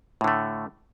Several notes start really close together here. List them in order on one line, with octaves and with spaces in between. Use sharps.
A2 D3 A3